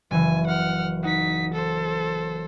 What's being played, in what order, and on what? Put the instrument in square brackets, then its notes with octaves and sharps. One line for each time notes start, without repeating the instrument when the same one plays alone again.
[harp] F#1 E3 [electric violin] G#5
[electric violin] F#5 F6
[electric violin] D#4 B6 [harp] F#5
[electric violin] A4 C5